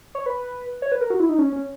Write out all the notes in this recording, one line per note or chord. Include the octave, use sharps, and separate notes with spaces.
C#5
B4
C#5
B4
A#4
F#4
E4
D#4
C#4
C#4